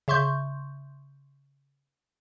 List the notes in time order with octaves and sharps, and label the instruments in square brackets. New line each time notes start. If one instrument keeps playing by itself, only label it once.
[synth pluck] C#3 E5 C6 C#6 G6